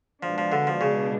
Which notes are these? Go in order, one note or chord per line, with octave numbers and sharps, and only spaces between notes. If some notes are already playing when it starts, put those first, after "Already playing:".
B2 F3 G#3 D4
F3
D3
F3
C#3